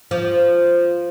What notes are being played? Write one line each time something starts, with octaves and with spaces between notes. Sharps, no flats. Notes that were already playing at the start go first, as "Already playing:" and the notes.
F3